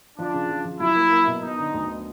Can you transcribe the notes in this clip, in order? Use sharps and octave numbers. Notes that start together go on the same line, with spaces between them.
F3 D4
C#3
F3
F3
F#3 E4
A#3
A#3
B2
B3 D#4
D3
D2